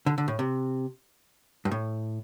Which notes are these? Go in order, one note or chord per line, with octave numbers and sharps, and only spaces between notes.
D3
D3
A2
C3
G2
A2